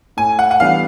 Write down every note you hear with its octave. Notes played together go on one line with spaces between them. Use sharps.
A2 G#5
F#5
F#5
E3 G3 B3 D4 F5